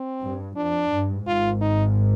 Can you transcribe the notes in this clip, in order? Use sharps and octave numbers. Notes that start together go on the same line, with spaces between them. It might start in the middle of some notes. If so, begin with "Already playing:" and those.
Already playing: C4
G2
F2 D4
G2
G#1 G#2 F4
D#4